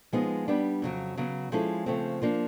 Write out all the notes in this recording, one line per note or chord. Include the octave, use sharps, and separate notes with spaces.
F3 G#3 B3 D#4
G3 B3 D4
F2 C#3 F#3
C#3 F#3 B3
F3 G#3 C#4 E4 A4
C#3 F3 A3 C4
F3 A#3 D4 F4